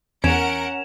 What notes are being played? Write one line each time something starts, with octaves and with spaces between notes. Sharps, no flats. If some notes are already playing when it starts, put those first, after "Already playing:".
E2 C#4 A#4 F#5 G#6 D7 E7 F7